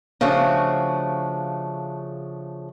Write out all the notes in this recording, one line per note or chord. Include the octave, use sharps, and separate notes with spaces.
C#3 F3 A3 D4 F#4